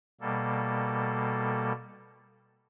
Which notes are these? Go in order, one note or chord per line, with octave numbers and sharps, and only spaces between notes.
B2 G3 A#3 A4